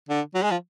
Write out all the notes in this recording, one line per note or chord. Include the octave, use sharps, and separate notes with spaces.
D3
F#3
G#3
F3